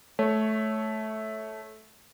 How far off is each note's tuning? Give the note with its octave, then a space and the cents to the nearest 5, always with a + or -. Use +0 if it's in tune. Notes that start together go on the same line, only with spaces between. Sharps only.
A3 -15 C#5 +0